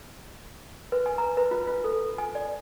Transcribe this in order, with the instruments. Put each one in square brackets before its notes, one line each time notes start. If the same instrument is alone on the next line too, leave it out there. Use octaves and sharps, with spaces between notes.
[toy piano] B4
G#5
A#5
B4
F4
F4
A4
G#5
D5